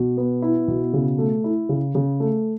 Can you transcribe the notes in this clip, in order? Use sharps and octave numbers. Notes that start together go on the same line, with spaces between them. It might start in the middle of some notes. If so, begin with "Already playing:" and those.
Already playing: B2
B3
E4
B2
C#3
A3
E4
C#3
C#3
A3